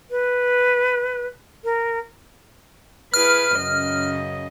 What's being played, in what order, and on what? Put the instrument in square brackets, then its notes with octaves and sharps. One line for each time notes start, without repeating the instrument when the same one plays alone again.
[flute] B4
A#4
[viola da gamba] E4 G#4 B4 [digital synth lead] F6
[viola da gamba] F#2 C#3 D#5